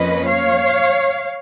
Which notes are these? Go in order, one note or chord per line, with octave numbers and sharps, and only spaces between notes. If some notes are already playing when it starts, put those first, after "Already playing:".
Already playing: F2 F3 A#3 C#4 B4 D#5
C#5 F5